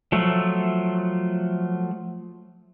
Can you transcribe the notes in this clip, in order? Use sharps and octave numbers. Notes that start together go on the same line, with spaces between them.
F3 F#3 A3